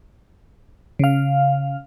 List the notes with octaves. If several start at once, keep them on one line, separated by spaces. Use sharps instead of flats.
C#3 F5